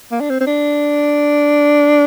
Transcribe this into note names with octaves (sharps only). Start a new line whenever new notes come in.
A#3
D4
C4
C4
D4